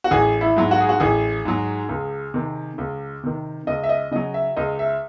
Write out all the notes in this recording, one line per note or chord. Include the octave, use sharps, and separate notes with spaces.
F#4
A1 G#4
E4
G#2 F#3
F#4
G#4
F#4
A1 G#4
G#2 F#3
C#2
C3 D#3
C#2
C3 D#3
C#2 D#5
E5
D#5
C#3 F#3 D#5
E5
C#2 D#5
E5